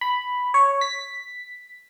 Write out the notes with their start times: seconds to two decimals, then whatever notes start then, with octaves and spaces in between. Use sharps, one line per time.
0.01 B5
0.54 C#5
0.81 B6